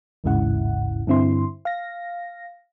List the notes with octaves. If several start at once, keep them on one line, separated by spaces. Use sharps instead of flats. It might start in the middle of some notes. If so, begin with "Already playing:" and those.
A1 D#2 G#2 C#3 E4 F#5
G2 D3 C4 E4 C6
F5 A#6